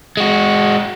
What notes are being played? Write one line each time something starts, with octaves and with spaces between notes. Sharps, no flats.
G#3 F#4